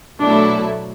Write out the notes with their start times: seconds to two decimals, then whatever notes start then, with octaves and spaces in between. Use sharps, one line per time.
0.19 B2 F#3 A3 D4 E4 A4